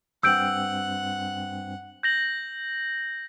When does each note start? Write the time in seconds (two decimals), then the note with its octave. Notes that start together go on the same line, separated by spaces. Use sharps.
0.23 G2 C4 F#5 G5 E6 G6 D7
2.03 G6 A#6 F#7